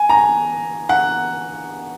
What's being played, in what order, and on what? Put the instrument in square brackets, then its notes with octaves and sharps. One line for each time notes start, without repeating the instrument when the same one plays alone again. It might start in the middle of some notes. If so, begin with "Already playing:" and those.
Already playing: [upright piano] G#5
A#5
F#5